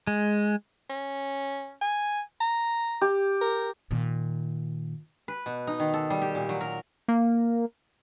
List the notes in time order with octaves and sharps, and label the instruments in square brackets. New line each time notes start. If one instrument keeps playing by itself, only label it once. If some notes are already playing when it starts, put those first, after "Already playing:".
[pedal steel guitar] G#3
[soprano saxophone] C#4
G#5
A#5
[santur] G4
[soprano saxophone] A#4
[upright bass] A#2 D#3
[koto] B4
B2
D#4
D#3
A4
G3
G4
A#2
F#3
A#4
[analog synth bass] A#3